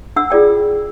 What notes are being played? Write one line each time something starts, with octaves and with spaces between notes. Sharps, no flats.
D4 F#5 E6
F4 G#4 D5 G5